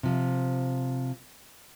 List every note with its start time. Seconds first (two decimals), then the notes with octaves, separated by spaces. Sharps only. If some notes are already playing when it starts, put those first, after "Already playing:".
0.03 C3 F3